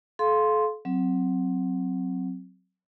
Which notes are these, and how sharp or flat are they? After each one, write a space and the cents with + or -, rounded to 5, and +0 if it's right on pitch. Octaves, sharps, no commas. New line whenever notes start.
A4 -40 F5 +0 C6 +0
F#3 +0 C4 +0